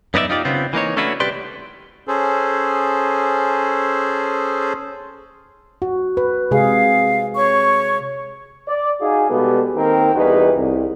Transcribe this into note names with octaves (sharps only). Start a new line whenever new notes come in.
F#2 B3 D#4 F#4 D5 E5
D#4 F4 G4 D5
C#3 B3 C4 F4
E3 A#3 D#4 C#5
A3 C#4 D4 E4 F#4 B4
C2 G4 B4 D5 C6
C#4 G#4 A4 C5
F#4
B4
C3 G#3 G#4 F5
C#5 C#6
D5
D#4 F#4 G#4 F5 G#5
B2 G3 G#3 B3 G4 A4
D#3 A#3 C4 A#4 G5
E2 G3 D#4 F#4 G#4 B4
C2